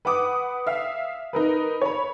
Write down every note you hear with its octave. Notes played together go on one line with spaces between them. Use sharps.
B4 F#5 D6 D#6
E5 F5
D#4 A#4 B4
C#5 B5